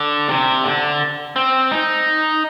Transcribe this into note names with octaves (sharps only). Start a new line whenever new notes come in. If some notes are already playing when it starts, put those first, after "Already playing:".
Already playing: D3
C3
D3
C4
D#4